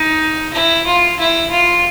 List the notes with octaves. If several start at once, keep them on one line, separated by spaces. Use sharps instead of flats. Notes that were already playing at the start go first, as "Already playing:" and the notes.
Already playing: D#4
E4
F4
E4
F4